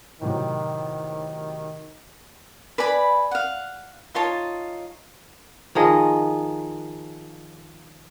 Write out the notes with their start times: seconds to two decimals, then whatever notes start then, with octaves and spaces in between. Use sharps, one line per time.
0.21 A2 C3 D#3 F#3
2.78 B4 D5 G#5 B5
3.31 F5 F#5
4.15 D#4 F4 C#5 A5
5.75 D#3 F3 G#4 D#5